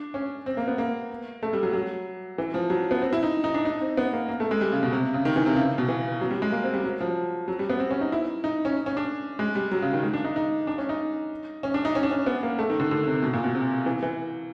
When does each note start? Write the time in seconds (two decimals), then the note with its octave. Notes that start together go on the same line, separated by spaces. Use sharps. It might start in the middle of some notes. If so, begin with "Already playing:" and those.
Already playing: D4
0.14 C#4
0.46 C4
0.57 A#3
0.68 B3
0.78 A#3
1.43 A3
1.53 G3
1.63 F#3
1.73 F#3
2.38 E3
2.54 F3
2.70 F#3
2.91 B3
3.02 C4
3.13 E4
3.23 D#4
3.44 D#4
3.54 D4
3.65 D#4
3.81 C4
3.97 B3
4.13 A#3
4.29 A#3
4.40 A3
4.51 G#3
4.61 G3
4.72 C#3
4.83 B2
4.93 C3
5.14 C#3
5.25 D#3
5.36 E3
5.46 C3
5.56 C#3
5.78 B2
5.88 E3
6.21 F#3
6.31 G3
6.42 G#3
6.52 A#3
6.63 C4
6.74 G3
6.84 F#3
7.01 F3
7.48 F#3
7.59 G3
7.70 B3
7.79 C4
7.91 C#4
8.01 D#4
8.12 E4
8.44 D#4
8.65 C#4
8.86 C#4
8.97 D4
9.39 G#3
9.55 G3
9.72 F#3
9.82 C#3
9.93 D#3
10.03 G#3
10.13 D4
10.24 D#4
10.36 D#4
10.67 D4
10.78 C#4
10.89 D#4
11.63 C#4
11.74 D4
11.85 D#4
11.95 C#4
12.03 D4
12.11 C#4
12.26 B3
12.43 A#3
12.59 A3
12.70 D#3
12.80 D3
12.91 D3
13.07 C3
13.23 B2
13.33 A#2
13.44 B2
13.55 C3
13.86 E3
14.03 E3